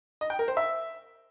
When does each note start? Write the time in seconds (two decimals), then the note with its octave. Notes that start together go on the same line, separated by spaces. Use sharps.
0.21 D#5
0.30 G5
0.39 A#4
0.48 C5
0.57 E5